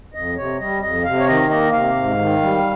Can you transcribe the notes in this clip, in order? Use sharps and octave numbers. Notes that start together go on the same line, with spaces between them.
F2 D#5
C3 C#5
G3 D#5
F2 D#5
C3 F5
C#5
D#3 D#5
A#3 D#5
C3 F5
G#2
D#3
G3